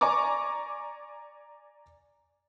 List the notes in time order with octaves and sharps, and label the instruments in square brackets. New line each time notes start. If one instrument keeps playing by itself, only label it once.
[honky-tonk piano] D5 G#5 A#5 C#6 D6